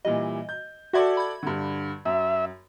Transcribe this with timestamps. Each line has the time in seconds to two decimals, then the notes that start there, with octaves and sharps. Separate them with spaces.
0.05 A#2 E3 G3 D#5
0.49 G6
0.93 F#4 A4 D5 E5 F#5 G#6
1.17 B5 G#6
1.43 G2 D3
2.05 F#2 E5